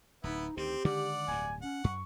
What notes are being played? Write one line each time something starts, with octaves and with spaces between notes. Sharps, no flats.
D1 B3 D#4 E4
D2 D#3 C4 G4
D3 D#3 G#3 D5 F#5
D1 G2 G#5
C#4 F#5
F#2 C#6